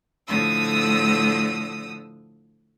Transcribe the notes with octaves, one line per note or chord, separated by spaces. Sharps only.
A2 D3 F3 D#6 E6